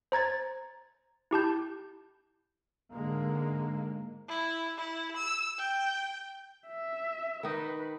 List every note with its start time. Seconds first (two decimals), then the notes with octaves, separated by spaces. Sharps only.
0.12 C5 A#5 G#6 A6
1.31 E4 G4 A5 G6
2.92 G#2 D3 G#3 A#3
4.28 E4
4.78 E4
5.16 E6
5.58 G5
6.68 E5
7.43 D#3 D#4 B4